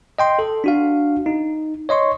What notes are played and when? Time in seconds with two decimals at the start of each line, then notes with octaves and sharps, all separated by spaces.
0.19 D#5 G5 C6
0.39 A4
0.64 D4 F#4 F5
1.26 D#4
1.89 C#5 D#5 C6 C#6